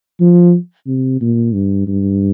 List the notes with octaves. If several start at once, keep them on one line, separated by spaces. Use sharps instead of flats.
F3
C3
A#2
G2
G2